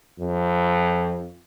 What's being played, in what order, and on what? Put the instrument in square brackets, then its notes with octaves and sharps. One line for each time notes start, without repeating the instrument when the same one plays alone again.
[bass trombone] F2